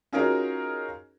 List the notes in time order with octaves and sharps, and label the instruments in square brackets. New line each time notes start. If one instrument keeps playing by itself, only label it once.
[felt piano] C#4 D#4 F4 F#4 G#4 A#4